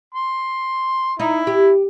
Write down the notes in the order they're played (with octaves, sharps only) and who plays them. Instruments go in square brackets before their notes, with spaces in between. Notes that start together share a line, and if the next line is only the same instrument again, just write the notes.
[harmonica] C6
[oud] D#4 [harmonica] E4
[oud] G4